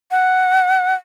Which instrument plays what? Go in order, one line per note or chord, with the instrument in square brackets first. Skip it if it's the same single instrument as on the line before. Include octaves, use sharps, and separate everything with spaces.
[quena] F#5